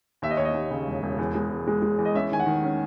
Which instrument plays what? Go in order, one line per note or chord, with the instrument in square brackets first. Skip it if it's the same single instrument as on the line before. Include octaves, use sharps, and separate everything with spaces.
[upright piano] D#2 E5
D#5
D#2 C#5
D#5
D#2
C#3
E1
E1
E2
G#3
E2
G#3
G#3
E2
D#5
C#4 E5
D#3 G#5
F#5
D#3
C#4